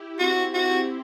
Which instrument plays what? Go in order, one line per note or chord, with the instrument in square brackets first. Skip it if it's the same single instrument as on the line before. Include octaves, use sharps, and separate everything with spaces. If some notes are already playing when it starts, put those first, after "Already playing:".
Already playing: [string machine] E4 G4
[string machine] C4 [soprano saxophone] F#4
[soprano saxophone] F#4